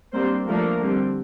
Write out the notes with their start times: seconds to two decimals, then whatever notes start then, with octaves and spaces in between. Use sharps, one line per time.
0.13 G3 A#3 C4 D4 C5
0.47 F3 A3 A#3 D4 A#4
0.79 D3 G3 C4